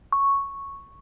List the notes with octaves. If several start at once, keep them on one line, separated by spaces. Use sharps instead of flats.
C#6